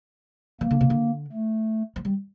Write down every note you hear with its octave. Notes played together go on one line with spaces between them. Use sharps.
E3 A#3
D3
C3
D3
A3
F3
G3